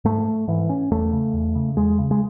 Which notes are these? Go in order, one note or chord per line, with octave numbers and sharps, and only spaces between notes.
G#2 A3
G#2 E3
C#4
E2 A3
C#3
E2
C#3
E2 G#3
C#3
G#3